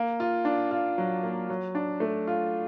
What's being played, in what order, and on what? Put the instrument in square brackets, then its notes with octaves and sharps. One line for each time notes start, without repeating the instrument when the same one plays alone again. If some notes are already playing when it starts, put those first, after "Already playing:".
Already playing: [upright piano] A#3
F4
D4
F4
F#3
A#3
F#3
D4
A3
F4